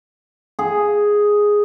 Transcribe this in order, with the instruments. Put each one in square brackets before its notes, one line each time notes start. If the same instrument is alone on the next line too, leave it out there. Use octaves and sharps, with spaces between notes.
[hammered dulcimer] G#4